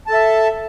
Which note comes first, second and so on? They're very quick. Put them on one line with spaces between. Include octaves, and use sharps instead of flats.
A5 A4 E5